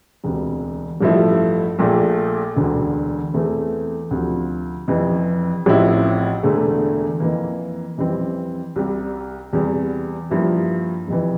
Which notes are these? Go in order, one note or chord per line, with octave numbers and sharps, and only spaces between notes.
E1 D2 C3
A1 G2 F3 A3 E4
A#1 A#2 A3
E1 D2 D3
E2 E3 A3 C4
D2 C3 F3
F1 F2 E3
A1 A2 F3 C4 E4
E1 E2 D3 A3
F2 E3 A#3
F2 E3 G3 C4
C2 C3 G3
E2 C3 G3
G2 F3 A#3 E4
F1 F2 E3